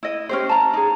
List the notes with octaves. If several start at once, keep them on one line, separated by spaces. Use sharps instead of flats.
E4 D#5
C#4 G4 C5
A5 A#5
D#4 G#4